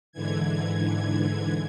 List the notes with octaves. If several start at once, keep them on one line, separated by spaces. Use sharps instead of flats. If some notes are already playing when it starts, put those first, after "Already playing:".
G#2 D3 E3 G#6